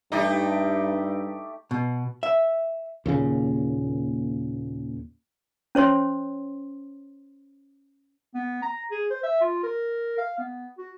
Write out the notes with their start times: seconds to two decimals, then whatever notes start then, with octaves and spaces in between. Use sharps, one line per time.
0.12 G2 A3 D#4 G4 D5
1.71 B2
2.23 E5
3.06 D#2 A#2 C#3
5.75 C#4 C5 C#5 C6
8.34 B3
8.62 A#5
8.91 G#4
9.10 C5
9.23 E5
9.41 F4
9.63 A#4
10.18 F5
10.38 B3
10.78 F#4